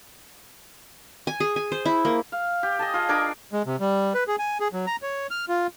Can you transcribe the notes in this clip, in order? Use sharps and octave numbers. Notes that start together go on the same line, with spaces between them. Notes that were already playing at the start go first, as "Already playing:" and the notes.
G#5
G#4
G#5
C5
E4
A#3
F5
G4
D#5 G#5 A5
F4 G#4
D4 A#4 G#5 D6
G#3
C3
G3
B4
G#4
G#5
G#4
F#3
A#5
C#5
F6
F4